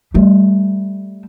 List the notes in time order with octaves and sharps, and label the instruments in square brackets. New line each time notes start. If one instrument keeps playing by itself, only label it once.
[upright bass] G3 A3